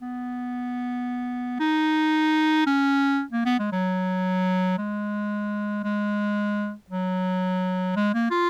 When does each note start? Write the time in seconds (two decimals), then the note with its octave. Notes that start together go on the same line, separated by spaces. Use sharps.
0.02 B3
1.60 D#4
2.67 C#4
3.32 A#3
3.45 B3
3.59 G#3
3.72 F#3
4.78 G#3
5.84 G#3
6.90 F#3
7.96 G#3
8.14 A#3
8.31 F4